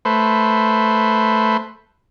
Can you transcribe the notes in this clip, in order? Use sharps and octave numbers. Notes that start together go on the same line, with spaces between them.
A3 B4 C5